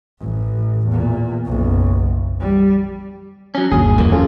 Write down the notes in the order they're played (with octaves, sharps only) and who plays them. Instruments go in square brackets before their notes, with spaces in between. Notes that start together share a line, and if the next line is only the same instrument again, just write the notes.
[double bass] A1
E2 A#2
F#1 B1
G3
[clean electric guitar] F#3 C#4
[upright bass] G1 C3 [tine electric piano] D#2 [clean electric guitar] G#4
[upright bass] F2 C4 [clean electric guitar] E3 A#3
[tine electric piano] C#4 G#4 A4 [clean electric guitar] F4